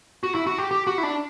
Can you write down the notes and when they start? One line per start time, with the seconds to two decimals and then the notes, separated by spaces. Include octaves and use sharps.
0.23 F#4
0.35 E4
0.47 F#4
0.58 G4
0.71 G4
0.87 F#4
0.98 E4
1.03 D4